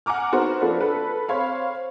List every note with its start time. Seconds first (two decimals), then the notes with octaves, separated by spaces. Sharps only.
0.06 F#5 G#5 A#5 D6 F6
0.32 B3 D#4 F#4 A#4 C5
0.61 F3 A#3 D4 A4 B4
0.81 A4 B4
1.28 C4 C5 C#5 F5 B5